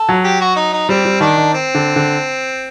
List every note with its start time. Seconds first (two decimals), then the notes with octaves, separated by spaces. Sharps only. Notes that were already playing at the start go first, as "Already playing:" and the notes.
Already playing: A4
0.09 F#3
0.24 G4
0.41 F#4
0.56 D#4
0.73 D#4
0.89 G3 C4
1.05 G3
1.20 D#3 D4
1.37 D#3
1.53 C4
1.75 D3
1.96 D3